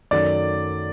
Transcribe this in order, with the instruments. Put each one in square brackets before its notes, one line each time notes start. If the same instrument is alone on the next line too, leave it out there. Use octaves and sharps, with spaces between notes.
[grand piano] F#2 D#3 F#3 A3 D5